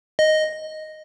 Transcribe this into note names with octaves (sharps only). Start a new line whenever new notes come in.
D#5